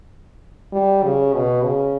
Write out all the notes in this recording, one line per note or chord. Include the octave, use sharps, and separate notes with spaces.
G3
C#3
B2
C#3